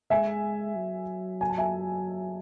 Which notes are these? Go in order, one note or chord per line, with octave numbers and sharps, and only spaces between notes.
G#3 E5 G#5
F#3
G#5
A5
E5 G#5